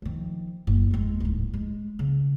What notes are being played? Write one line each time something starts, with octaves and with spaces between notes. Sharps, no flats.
D#3 F3
F#1
E2 G#3
D1 G#2
G#3
C#3